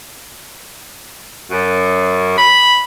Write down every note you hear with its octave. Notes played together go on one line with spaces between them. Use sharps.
F#2
B5